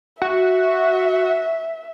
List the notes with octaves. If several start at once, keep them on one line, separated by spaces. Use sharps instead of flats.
F#4 E5